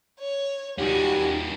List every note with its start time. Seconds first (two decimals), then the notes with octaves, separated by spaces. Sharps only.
0.19 C#5
0.79 D#2 G3 D#4 F#4 G4 G#5